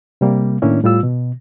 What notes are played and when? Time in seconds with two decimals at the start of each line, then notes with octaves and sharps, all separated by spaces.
0.21 C3 G3 A#3
0.62 A2 D#3 A#3 C#4 D4 E4
0.83 A2 G3 F4 E6
1.03 B2